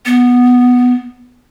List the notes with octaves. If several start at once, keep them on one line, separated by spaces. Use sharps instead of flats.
B3